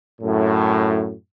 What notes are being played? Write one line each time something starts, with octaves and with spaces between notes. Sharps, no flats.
F#2 A2